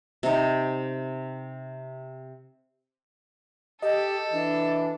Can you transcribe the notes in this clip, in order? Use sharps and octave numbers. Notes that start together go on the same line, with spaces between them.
C3 D#4
G4 A4 D#5
E3 D4